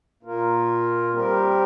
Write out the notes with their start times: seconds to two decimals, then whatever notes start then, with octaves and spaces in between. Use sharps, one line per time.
0.23 A#2 A#3 F4 A#4
1.12 G3 C4 G4 A#4